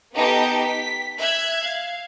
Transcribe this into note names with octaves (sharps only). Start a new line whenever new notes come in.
B3 D#4 G4 A4
B6
E5 F#6 G#6
F5